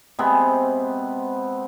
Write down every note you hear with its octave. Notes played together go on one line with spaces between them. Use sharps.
C3 G#3 B3 C4